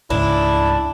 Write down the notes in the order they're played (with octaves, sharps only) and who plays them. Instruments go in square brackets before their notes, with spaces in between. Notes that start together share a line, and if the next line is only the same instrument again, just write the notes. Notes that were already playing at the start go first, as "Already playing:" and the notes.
[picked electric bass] C#2 G#2 C#3 [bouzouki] D4 [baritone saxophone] E4